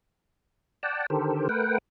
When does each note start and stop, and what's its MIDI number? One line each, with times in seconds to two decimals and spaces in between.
0.83 1.06 74
0.83 1.06 78
0.83 1.06 79
0.83 1.06 81
1.10 1.48 50
1.10 1.48 51
1.10 1.48 67
1.10 1.48 69
1.10 1.48 70
1.10 1.48 72
1.49 1.78 57
1.49 1.78 70
1.49 1.78 71
1.49 1.78 78
1.49 1.78 79